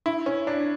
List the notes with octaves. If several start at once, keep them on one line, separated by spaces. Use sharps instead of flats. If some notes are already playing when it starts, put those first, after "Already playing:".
E4
C#4
D4